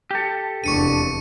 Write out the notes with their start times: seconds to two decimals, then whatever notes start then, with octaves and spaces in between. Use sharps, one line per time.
0.11 G4 A4
0.64 F1 E2 D4 C#6 C#7 D#7